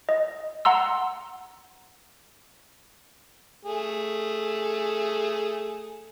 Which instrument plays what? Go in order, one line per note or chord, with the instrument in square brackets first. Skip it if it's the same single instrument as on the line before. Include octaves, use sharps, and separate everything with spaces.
[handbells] D#5
F#5 A#5 C6 E6
[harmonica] A3 G#4